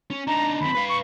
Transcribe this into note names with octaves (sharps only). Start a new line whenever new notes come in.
C#4
D4 D#4 A#5
D#2 C4 B5
B4 F5
C#6